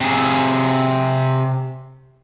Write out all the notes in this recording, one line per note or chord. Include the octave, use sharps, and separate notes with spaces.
C3 G#4